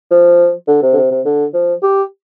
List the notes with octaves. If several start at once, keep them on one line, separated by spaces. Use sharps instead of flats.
F3
D3
C3
D3
C3
C3
D3
F3
G4